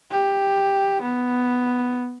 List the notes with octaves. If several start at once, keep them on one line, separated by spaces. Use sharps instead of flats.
G4
B3